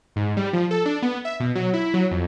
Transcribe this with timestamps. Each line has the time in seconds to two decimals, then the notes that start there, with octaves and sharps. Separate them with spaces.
0.16 G#2
0.37 G3
0.53 F3
0.71 A4
0.86 D4
1.02 B3
1.25 E5
1.40 B2
1.55 F#3
1.74 E4
1.94 F#3
2.11 F2